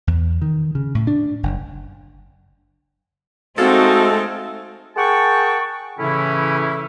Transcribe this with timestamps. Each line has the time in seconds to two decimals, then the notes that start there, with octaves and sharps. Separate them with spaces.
0.07 E2
0.42 D#3
0.75 C#3
0.95 A2
1.07 D4
1.43 F#1
3.58 G#3 A3 C4 D#4 F#4 A4 F5
4.97 G#4 A#4 F#5 G5 A5 C#6
5.99 A2 C#3 E3 C#4 E4